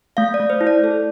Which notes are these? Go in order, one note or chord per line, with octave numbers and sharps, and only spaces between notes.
A3 F5
D5
A3
C5
E4
D5
A4